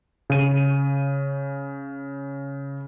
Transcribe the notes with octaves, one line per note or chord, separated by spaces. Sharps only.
C#3 D#7